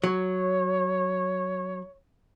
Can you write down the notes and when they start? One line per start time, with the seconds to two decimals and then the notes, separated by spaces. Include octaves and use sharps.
0.04 F#3 C#5